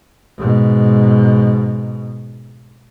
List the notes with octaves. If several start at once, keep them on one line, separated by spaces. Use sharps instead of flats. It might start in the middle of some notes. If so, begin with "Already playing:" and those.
G#2 B2